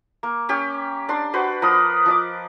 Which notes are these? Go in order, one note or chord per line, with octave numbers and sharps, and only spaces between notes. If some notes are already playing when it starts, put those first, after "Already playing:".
A#3
C#4 G4
D4 D5 C6
F#4 B4 C5
F3 A#4 B4 D#6
F3 D#5 D6